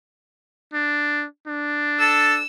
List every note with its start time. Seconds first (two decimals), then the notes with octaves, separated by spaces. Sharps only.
0.73 D4
1.47 D4
2.00 A4 E6